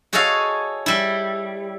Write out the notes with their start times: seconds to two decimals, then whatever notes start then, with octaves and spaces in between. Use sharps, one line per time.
0.13 F#4 G#4 A4 C#5 D#5 F5
0.86 G3 E4